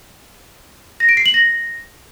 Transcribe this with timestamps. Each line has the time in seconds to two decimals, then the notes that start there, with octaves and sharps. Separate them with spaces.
1.00 A#6
1.09 D7
1.17 C7
1.26 F#7
1.34 A#6